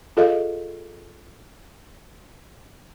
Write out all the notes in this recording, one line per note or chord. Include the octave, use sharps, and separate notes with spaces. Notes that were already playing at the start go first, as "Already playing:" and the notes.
F4 G#4 A4 D#5 F5